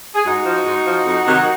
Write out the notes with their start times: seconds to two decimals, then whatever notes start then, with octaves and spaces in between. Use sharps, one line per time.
0.15 G#4
0.25 G#2 D#4 F#4
0.46 F3
0.65 G#2
0.86 F3
1.06 F2
1.26 C3 D#3 F#3